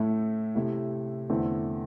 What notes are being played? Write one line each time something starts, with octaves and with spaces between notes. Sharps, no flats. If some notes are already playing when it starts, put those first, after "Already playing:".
Already playing: A2 A3 E4
C3 A3 E4
E2 D3 A3 C4 E4